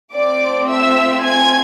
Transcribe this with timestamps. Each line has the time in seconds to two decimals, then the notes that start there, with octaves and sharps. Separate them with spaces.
0.14 A3 C4 F4 D5 D6
0.68 E5 E6
1.22 G#5 G#6